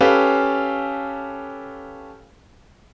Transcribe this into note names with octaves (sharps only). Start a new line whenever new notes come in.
C#4 G4 A4 B4 F5